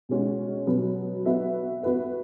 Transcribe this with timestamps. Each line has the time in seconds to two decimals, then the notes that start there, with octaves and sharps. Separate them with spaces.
0.09 B2 G#3 C#4 F#4
0.67 B2 F#3 B3
1.26 B3 F#4 B4 E5
1.83 B3 F#4 B4